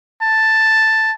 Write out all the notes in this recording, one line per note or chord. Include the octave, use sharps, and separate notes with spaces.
A5